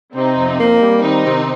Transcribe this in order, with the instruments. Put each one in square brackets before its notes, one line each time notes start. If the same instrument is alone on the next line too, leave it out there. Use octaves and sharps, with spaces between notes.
[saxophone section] C3 [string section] C4 D#4
[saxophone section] F2
A#3
G3
[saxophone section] D#3 [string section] C4 D#4
[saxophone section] C3